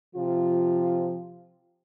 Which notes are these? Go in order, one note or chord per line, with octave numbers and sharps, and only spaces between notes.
C3 F3 F4